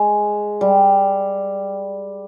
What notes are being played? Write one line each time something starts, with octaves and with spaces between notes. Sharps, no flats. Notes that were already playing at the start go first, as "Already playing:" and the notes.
Already playing: G#3
G3